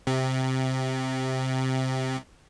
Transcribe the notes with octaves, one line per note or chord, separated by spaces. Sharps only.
C3